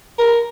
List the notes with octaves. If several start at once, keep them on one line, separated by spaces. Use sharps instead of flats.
A#4